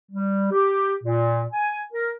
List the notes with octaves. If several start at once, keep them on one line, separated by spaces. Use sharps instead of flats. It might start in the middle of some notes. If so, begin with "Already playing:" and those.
G3
G4
A#2
G#5
A#4